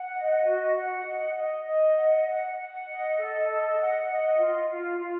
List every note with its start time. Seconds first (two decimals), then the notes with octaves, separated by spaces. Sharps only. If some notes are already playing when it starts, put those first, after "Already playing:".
Already playing: F#5
0.14 D#5
0.44 F#4
0.75 F#5
1.05 D#5
1.36 D#5
1.65 D#5
1.95 F#5
2.25 F#5
2.56 F#5
2.86 D#5
3.17 A4
3.47 D#5
3.77 F#5
4.08 D#5
4.38 F4
4.68 F4
4.99 F4